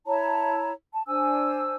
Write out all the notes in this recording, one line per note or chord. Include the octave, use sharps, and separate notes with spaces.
E4 C#5 A5 A#5
A5
D4 C5 G#5 E6